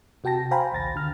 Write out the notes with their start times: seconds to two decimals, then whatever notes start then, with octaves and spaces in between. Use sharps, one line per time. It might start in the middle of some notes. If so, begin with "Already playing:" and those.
0.24 C3 F#4 G5 A5 A#6
0.51 C5 F5 G5 G#5 A#5 B5
0.72 A#1 D#2 A6 A#6
0.95 D#2 D3 F6